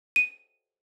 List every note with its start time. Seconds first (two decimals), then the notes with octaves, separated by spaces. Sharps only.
0.16 D#7